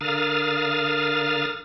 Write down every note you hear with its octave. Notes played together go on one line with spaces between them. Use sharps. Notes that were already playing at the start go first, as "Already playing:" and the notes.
D3 A#4 F5 D#6 F6 A6